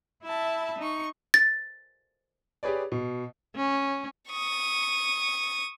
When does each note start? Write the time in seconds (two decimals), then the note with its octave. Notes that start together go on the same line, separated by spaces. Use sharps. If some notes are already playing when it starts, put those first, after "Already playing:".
0.24 E4 E5 A5 B5
0.78 D#4 C#6
1.34 A6
2.63 G4 G#4 B4 C#5 D5
2.92 B2
3.56 C#4
4.30 C#6 D#6